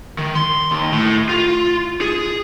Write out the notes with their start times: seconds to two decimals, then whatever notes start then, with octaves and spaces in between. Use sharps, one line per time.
0.19 D#3
0.35 C6
0.71 D#2
0.93 A2
1.29 F4
2.01 G#4